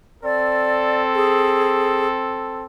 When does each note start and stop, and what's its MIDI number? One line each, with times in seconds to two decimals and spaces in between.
0.24 2.66 60
0.24 2.66 69
0.24 1.03 74
1.15 2.07 68